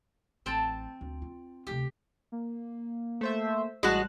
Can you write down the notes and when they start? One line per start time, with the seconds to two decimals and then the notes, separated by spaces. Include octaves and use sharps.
0.46 A1 C4 G5 A5
1.01 D2
1.22 F4
1.67 D2 C3 G4
2.32 A#3
3.21 A3 C5 E5
3.83 A1 G3 G#3 F#4 A5 F#6